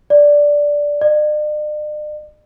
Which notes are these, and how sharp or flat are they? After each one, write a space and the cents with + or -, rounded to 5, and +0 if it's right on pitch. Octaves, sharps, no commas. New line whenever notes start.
D5 -5
D5 +45